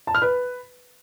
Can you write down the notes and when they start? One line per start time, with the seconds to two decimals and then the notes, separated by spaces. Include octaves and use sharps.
0.07 A5
0.15 F6
0.22 B4